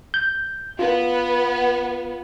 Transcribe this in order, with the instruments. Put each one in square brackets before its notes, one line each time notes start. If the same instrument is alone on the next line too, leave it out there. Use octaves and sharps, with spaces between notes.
[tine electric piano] G6
[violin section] B3 [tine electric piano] F4